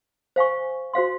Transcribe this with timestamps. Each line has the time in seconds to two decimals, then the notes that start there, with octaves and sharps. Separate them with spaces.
0.36 C5 F5 G#5 C#6
0.94 F#4 C5 F5 C6